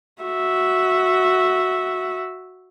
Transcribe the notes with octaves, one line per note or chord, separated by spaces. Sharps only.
F#4 E5